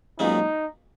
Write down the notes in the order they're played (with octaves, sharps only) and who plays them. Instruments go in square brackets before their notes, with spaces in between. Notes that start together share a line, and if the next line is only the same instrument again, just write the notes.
[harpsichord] B1 A#2 G#3 C#4 [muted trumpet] D#4